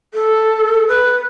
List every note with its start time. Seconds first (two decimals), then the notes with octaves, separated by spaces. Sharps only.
0.14 A4
0.88 B4